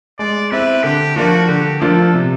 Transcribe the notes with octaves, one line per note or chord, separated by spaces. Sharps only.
G#3 D5
C4 E4 B4
D3 G4
F3 A#3 D4 F4 F#4
D3 G4
F3 A#3 D4 F4 A4
C3